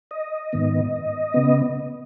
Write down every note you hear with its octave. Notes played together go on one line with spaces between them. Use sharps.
D#5
G#2 D#3 B3
C#3 B3